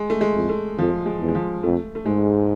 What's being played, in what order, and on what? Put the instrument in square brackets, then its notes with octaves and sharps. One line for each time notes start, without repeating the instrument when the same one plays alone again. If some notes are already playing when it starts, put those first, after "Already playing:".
Already playing: [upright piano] G#3
A3
G#3
[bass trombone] F2
[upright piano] A3
[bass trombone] F2 [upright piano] F3
[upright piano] G#3
[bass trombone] E2
[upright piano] G#3
F3
[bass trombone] F2 [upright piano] A3
[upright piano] A3
[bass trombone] G#2 [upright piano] G#3